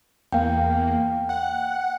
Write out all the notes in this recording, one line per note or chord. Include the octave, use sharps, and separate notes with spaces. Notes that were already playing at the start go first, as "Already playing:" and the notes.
E2 A#3 F5 G5
F#5